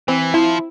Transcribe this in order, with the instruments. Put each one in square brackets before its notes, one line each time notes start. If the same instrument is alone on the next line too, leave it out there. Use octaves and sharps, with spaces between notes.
[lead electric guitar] E3 [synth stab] C4
[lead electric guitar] F3 [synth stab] E4